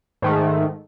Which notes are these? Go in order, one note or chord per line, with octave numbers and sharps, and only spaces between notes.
G#2 D#3 A3